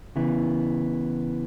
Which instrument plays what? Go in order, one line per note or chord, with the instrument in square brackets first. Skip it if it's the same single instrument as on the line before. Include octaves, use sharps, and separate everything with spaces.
[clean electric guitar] C#3 E3 B3 E4